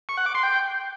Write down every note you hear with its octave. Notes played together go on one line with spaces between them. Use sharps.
C#6
F#5
D6
C6
G5